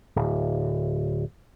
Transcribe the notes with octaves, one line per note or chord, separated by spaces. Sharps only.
D1